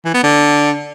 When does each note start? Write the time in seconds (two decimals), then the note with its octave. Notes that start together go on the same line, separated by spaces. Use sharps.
0.05 E3
0.14 B3
0.23 D3